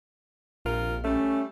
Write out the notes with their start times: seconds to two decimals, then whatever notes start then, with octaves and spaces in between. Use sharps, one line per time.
0.65 A#1 C3 F4 A#4
1.04 G3 A3 C#4